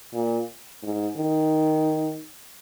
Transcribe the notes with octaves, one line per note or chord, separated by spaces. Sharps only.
A#2
G#2
D#3